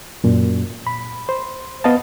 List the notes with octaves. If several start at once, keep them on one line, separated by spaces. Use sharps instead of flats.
F#2 A#2
B5
C5
B3 D#5 F5 A5